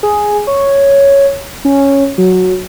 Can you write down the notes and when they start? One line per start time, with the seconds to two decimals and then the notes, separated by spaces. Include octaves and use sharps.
0.03 G#4
0.47 C#5
1.65 C#4
2.18 F#3